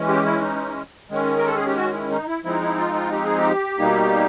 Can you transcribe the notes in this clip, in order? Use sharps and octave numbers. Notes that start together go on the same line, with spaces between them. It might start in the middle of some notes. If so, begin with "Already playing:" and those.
Already playing: E3 G#3 C#4
G4
E4
D#4
D#3 G#3 C#4
A#4
A4
G#4
G4
F#4
E4
D#4
E4
F3 G#3 C4 D#4 E4
E4
F4
F4
G4
G#4
G4
B2 G3 A#3 D#4